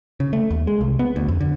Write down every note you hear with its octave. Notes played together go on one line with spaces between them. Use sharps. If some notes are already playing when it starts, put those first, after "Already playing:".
C#3
A3
D#2
G#3
C2
B3
D2
F2
D3